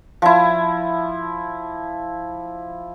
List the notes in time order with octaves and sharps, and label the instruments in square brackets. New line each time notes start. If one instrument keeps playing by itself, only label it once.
[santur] F3 E4